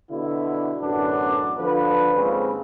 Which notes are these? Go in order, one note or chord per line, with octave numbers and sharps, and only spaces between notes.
B2 D3 E4
A1 F#2 D3 B3 D4
D3 F3 B4
D#2 G#2 C#3 C4 C#4